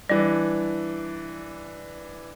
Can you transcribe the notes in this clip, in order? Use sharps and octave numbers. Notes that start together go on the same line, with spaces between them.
E3 G3 D4 D5